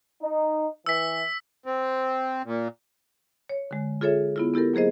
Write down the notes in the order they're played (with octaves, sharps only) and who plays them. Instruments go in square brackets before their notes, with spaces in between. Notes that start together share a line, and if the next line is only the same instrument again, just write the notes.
[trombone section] D#4
[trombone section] E3 [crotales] E6 B6
[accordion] C4
A#2
[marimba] C#5
D3 G#3
F4 G#4 A4 C#5 E5
B3 E4 F4
B3 E4 G4 A4 A#4
F#3 A#3 G#4 C5 D#5